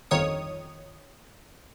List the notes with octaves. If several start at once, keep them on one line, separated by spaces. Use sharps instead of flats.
G1 F2 D#3 C#5 D#6